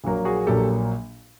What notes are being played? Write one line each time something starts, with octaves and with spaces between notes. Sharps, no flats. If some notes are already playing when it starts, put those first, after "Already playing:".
A#1 A#2 F#3 A#3
F#4 G#4
A#1 A#2 F#3 A#3 G4 A4